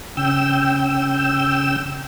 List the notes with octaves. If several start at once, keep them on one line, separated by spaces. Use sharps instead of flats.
C#3 G5 E6